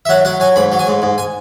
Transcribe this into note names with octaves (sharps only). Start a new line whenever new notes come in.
E5
F#3 F#5
F#3 F#5
F#3 G#5
G#2 B5
F#3
G#5
G#2
G#2
G#5